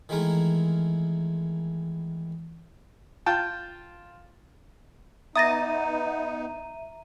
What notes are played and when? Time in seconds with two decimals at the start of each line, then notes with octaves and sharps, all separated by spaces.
0.09 D#3 E3 G#3 A3 A#4
3.26 F4 G5 A5
5.36 B3 D#4 E5 A#5 D#6 A6 A#6 D#7